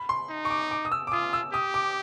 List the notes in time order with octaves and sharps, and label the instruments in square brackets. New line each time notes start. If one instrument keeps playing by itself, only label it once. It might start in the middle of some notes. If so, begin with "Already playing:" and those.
Already playing: [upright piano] B5
C6
[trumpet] D#4
[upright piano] C#6
D6
D6
D#6
E6
D6
[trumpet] F4 [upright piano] D#6
[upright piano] E6
[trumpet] G4 [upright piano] D#6
[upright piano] D6